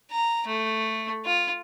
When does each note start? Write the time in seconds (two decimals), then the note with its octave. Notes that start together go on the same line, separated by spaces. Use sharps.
0.11 A#5
0.47 A3
1.25 F4